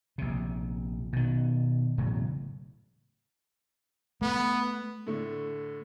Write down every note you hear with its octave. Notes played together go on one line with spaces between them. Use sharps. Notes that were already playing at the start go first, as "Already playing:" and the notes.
A#1 C3
B2 D#3
E1 A2 C#3 F#3
A3 B3
A2 D3 A3